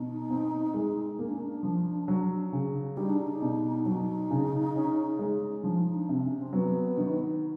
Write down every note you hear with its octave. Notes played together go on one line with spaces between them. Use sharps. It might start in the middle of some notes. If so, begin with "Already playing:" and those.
Already playing: B2 D#4
C4
G#3
A#3 D#4
D4
C#4
D4
F3
F#3
C#3
G3 D#4
D4
D#4
B2
F#3 D#4
C#3
C#4
G#3
F3 D#4
D4
C3
C#4
C4
F#3 B3
D#3